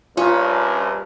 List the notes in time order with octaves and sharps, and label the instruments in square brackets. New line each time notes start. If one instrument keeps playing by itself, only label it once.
[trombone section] A#1 G2 A#2 [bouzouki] C#4 [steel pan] F4